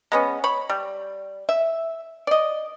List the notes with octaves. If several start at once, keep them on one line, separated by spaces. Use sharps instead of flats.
G#3 B3 C#4
C#5 B5
G3
E5
D5 D#5